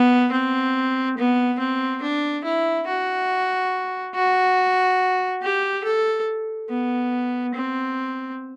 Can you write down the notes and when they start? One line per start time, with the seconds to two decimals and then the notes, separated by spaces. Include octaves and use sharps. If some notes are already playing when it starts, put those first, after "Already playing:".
Already playing: B3
0.32 C4
1.17 B3
1.60 C4
2.02 D4
2.44 E4
2.87 F#4
4.15 F#4
5.42 G4
5.84 A4
6.70 B3
7.55 C4